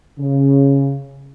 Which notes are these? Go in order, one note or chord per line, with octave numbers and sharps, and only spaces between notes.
C#3